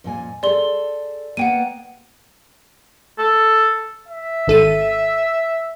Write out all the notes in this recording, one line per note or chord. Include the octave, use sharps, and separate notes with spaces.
F2 A#2 G#5
G#4 A4 D5 C6 G7
A#3 B3 F#5 G5 D#7
A4
E5
G#1 A4 D#7